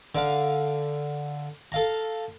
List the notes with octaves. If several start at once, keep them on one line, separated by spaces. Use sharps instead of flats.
D3 F5
A4 F5 A#5